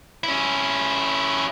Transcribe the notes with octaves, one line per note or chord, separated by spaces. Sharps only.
C#4 E4